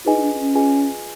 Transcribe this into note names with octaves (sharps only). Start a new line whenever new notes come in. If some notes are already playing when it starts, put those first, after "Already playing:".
D#4 F4 G#4 B4 D#5 G#5
D#4
D4
D4
C#4
F4 G#4 B4 D#5 G#5